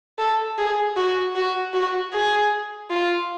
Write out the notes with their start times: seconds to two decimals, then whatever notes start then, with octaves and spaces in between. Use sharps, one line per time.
0.19 A4
0.58 G#4
0.96 F#4
1.36 F#4
1.74 F#4
2.13 G#4
2.90 F4